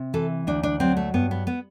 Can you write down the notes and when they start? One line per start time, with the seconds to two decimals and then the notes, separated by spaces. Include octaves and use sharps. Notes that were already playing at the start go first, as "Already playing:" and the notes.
Already playing: C3
0.14 E3 A4
0.47 D2 D4
0.63 D4
0.80 F#3 C4
0.97 A3
1.14 G2 B3
1.31 B3
1.47 B3